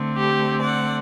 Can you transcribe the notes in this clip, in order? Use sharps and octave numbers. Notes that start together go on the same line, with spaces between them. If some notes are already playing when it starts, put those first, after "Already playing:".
Already playing: D3 A3 C4
G4
D5 F#5